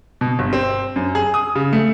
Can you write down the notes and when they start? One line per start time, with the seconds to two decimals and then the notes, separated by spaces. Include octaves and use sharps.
0.21 B2
0.39 G1
0.53 C4
0.96 F#2
1.15 G#4
1.34 D#6
1.55 C#3
1.73 A3